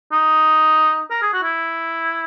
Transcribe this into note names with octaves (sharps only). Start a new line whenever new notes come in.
D#4
A#4
G#4
F#4
E4